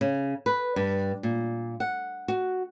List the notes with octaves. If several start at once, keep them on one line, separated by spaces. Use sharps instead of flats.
C#3
B4
G2
A#2
F#5
F#4